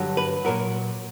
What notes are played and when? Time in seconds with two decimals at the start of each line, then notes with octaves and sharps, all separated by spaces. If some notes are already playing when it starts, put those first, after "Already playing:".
Already playing: G2 D3 F#3
0.17 B4
0.45 A#2 F#3 A#4